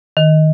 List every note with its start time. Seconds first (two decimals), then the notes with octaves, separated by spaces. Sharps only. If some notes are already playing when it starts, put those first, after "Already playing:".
0.17 D#3